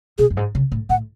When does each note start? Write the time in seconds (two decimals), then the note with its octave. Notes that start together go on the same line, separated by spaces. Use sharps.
0.18 B2 G#4
0.30 F#2
0.37 G#2
0.55 C#3
0.72 A2
0.89 A2 F#5